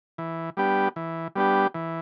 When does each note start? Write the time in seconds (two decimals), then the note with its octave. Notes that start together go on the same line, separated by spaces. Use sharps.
0.18 E3
0.57 G3 B3 D4 G4
0.96 E3
1.35 G3 B3 D4 G4
1.74 E3